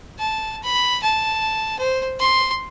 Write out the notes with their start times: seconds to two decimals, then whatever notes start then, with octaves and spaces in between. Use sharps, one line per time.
0.19 A5
0.63 B5
1.03 A5
1.79 C5
2.19 C6